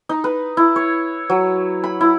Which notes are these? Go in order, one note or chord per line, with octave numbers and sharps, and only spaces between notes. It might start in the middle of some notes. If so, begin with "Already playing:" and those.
D#4
B4
E4
C#5
F#3
B5
E4